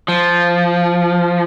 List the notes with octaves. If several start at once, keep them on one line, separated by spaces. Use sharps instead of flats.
F3